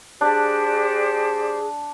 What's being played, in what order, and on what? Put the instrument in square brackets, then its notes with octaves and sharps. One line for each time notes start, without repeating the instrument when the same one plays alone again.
[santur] D4 [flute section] G4 C5 D5 [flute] G#4